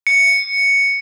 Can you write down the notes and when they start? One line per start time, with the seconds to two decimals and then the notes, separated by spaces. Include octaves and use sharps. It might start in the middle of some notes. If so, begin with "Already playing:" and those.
0.07 C#7